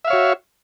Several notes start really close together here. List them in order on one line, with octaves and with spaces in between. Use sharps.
E5 F5 C#5 F#4